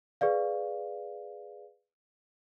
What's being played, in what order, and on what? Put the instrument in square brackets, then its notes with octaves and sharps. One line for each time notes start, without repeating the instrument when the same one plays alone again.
[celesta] G#4 B4 D5 F5